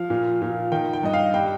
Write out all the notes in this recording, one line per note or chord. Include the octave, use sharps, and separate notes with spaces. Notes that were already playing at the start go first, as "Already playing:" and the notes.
Already playing: F3 F5
A#2
A#2
D#3 G5
G5
G2 D#5
F5
G3 G5